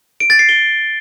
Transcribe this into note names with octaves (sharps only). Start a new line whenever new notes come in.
D7
A6
C7
G7